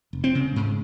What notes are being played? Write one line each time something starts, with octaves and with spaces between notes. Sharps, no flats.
F1
C4
C#3
G#2